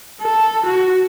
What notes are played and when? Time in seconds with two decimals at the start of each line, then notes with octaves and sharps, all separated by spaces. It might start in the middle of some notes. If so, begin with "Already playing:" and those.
0.22 A4
0.66 F#4